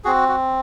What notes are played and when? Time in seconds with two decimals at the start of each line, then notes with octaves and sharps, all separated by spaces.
0.04 C4 F#4 G#4
0.29 F#4